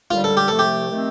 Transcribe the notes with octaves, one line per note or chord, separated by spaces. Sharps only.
D#2 D3 G3 F4
A4
G4
C2 C3 F3 A3 A4
G4
D#3 A3 C4